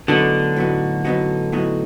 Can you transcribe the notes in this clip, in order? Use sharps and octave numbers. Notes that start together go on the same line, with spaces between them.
A2 D3 F#3 B3 D#4 F#4
A2 F#3 B3 D#4 F#4
A2 F#3 B3 D#4 F#4
A2 F#3 B3 D#4 F#4